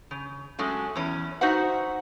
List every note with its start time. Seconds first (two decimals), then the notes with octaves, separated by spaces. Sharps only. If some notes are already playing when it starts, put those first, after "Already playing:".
0.11 C#3
0.59 F#3 G#3 A3 C#4
0.96 E2 C#4 E4
1.41 D#4 F#4 C5 E5 F#5